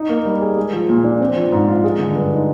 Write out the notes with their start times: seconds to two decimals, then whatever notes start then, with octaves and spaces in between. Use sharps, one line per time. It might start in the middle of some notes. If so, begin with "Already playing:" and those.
Already playing: D#4
0.09 A#3
0.25 G3
0.41 G#4
0.57 G#3
0.73 F3
0.89 A#2
1.04 D4
1.21 C4
1.36 F3
1.52 G#2
1.68 F4
1.84 G#3
1.99 D3
2.15 G2
2.32 D#4